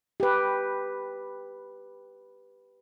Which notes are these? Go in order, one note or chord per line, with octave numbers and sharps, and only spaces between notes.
G4 B4